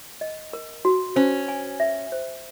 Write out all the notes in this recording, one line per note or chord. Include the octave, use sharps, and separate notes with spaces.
D#5
A#4
F#4
C#4 C5
G#5
E5
C5